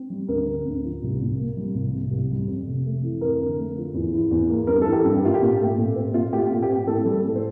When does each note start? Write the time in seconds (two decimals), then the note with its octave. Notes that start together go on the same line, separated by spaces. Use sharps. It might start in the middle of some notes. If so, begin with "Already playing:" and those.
Already playing: C4
0.10 G3
0.28 D2 A#4
0.47 D3
0.66 D2
0.84 F3
1.03 C2
1.21 A#2
1.39 A#3
1.57 G3
1.75 C2
1.93 C3
2.11 C2
2.30 G3
2.48 F2
2.67 C3
2.85 A3
3.03 E3
3.21 F2 A#4
3.40 D3
3.57 A3
3.77 F3
3.94 E2
4.13 E3
4.31 E2
4.49 A#3
4.67 G2 A#4
4.82 E3 A4
4.92 G4
5.05 G2
5.16 G4
5.23 A#3 F4
5.34 G4
5.41 A#2
5.59 A3
5.77 A#2
5.96 C4
6.14 A#2 F4
6.32 A3 G4
6.38 F4
6.51 A#2
6.62 G4
6.69 C4
6.87 A2 A4
7.05 G3
7.11 A4
7.24 A2
7.35 C5